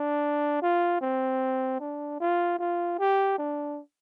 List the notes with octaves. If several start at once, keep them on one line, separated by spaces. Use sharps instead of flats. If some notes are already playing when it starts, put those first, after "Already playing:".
Already playing: D4
F4
C4
D4
F4
F4
G4
D4